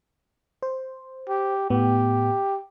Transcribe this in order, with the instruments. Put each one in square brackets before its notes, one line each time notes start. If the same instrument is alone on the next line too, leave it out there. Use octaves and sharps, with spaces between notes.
[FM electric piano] C5
[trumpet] G4
[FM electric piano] A2 B3 [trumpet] G4